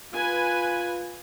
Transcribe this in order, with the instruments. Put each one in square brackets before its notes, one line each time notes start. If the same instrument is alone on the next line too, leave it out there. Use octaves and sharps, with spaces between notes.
[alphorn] F4 [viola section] B4 G#5